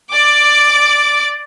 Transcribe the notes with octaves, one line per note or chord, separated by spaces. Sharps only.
D5 D6